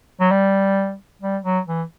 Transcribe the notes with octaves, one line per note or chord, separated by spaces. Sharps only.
F#3
G3
G3
F#3
E3